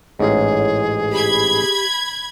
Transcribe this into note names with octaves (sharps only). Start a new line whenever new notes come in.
A1 G#2 G#4 C#5
G4 B5 G#6